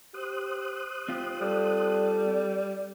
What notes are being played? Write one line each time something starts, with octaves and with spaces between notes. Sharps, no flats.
G4 C5 D#6 F#6
C4 F4 G4
G3 A4